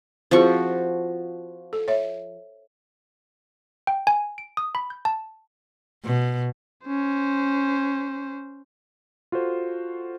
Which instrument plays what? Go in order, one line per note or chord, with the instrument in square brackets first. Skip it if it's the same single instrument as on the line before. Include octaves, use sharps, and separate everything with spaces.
[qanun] F3 F#4 C#6 [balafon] C4 E4 G#4
[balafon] A4
C#5 E5
[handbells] G5
G#5
D7
D#6
B5
G6
A5
[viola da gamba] B2
[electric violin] C#4 C5
[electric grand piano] F4 F#4 A4 C5